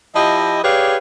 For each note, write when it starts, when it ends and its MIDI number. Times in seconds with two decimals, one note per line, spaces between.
0.16 0.59 53
0.16 0.59 64
0.16 0.59 67
0.16 0.59 75
0.63 0.97 67
0.63 0.97 68
0.63 0.97 71
0.63 0.97 73
0.63 0.97 74
0.63 0.97 77